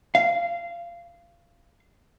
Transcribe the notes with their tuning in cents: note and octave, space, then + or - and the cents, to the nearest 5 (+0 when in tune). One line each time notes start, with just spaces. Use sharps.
F5 -20